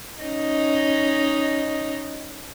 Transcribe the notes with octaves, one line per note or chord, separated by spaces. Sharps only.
C#4 D#4 D#5